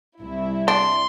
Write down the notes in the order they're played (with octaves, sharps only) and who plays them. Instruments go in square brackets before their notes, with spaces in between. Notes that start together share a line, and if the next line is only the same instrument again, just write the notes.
[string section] C2 E4
[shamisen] D4 [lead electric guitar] C6